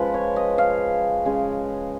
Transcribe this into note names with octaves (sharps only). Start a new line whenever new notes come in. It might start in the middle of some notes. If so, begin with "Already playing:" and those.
Already playing: C#3 F3 G#3 B4
C#5
D#5
F5
C#3 G#3